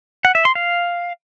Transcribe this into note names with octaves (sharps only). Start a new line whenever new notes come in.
F#5
E5
C6
F5